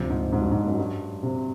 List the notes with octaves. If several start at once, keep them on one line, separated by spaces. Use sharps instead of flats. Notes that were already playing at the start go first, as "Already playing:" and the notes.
Already playing: D2 G2 C3 F3
G#2
G#2
G2
G#2
F#2
G2
C3